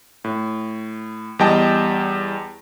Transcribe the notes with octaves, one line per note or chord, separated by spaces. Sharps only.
A2
E2 G3 D#5 G5 A5